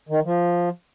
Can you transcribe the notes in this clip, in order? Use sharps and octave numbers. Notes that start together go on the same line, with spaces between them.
D#3
F3